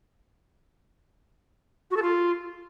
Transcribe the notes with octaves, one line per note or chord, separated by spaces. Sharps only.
F#4
A4
F4